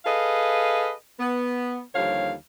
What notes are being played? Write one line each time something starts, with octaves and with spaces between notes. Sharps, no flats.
G#4 A4 B4 D#5 F5
B3
D#2 D3 F3 G3 C#5 F5